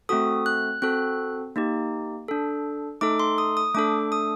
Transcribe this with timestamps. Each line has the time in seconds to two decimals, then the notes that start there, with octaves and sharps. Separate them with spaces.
0.09 A3 C4 F#4 A4 D#6
0.46 F#6
0.82 C4 F#4 A4 F#6
1.56 A#3 D#4 G4
2.28 D4 A4
3.01 A3 D#4 A4 D6
3.20 C6
3.38 D#6
3.57 D#6
3.75 A3 D4 A4 D6
4.12 D#6